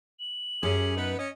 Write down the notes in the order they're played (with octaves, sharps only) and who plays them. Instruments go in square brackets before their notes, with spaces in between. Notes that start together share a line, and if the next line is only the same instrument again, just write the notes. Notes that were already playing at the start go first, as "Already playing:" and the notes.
[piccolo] F#7
[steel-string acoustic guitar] F#2 [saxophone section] C#4 G4 G#4
[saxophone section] B3 D#4 B4
C#4 D#5